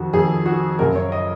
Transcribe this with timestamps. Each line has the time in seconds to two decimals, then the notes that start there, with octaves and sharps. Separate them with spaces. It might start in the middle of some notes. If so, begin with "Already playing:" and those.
Already playing: F2 D#3 F#4
0.13 F2 D#3 G#4
0.46 F#4
0.79 F#2 C#3 A#4
0.96 C#5
1.12 D#5